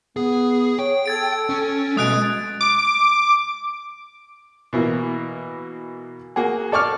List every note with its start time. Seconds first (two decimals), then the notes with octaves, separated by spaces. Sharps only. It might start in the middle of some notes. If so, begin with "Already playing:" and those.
0.17 B3 G#4
0.79 C#5 G5
1.06 A4 G#6 A6 D7
1.49 C#4
1.97 B2 G#3 A3 D#6 F#6 D7
2.61 D6
4.73 B2 E3 A#3
6.36 A#3 F#4 G#4
6.72 A4 D5 C#6 D6 F6